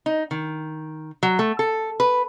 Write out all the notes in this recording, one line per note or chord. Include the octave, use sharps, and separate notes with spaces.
D#4
D#3
F#3
A3
A4
B4